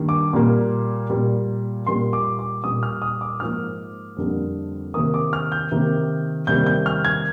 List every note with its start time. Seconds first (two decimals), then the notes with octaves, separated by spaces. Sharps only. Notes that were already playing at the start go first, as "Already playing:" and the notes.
Already playing: G2 D#3 G3 A#3
0.09 D6
0.33 A#2 G3 A#3
1.10 A#2 G3 A#3
1.87 A#2 G3 A#3 C6
2.13 D6
2.39 D6
2.64 A#2 G3 A#3 D#6
2.83 F6
3.02 D#6
3.21 D6
3.40 G#2 F3 A#3 F6
4.17 F2 D3 G3 A#3
4.94 C3 D#3 A#3 D#6
5.14 D6
5.33 F6
5.52 G6
5.71 C3 D#3 A#3
6.47 C3 D#3 G3 A#3 G6
6.66 G6
6.86 F6
7.05 G#6